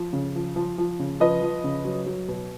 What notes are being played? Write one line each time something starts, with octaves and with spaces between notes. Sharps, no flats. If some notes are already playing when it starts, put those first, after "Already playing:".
Already playing: F3
C#3
F3
F3
F3
C#3
F3 B4 D#5
F3
C#3
F#3
F#3
B2